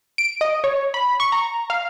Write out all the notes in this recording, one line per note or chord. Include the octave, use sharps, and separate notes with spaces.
D7
D#5
C#5
B5
C#6
A#5
F5